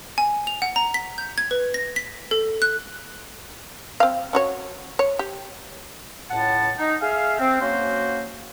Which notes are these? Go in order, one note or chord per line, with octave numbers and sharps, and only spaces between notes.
G#5
F7
F#5
A#5
B6
G6
G#6
B4
A#6
B6
A4
F#6
C4 F5
C#4 F#4 C#5
C#5
G4
C#2 A2 F#5 A5
D#4
G#4 E5 F5
C4
F#3 A#3 C#4 F#4 C5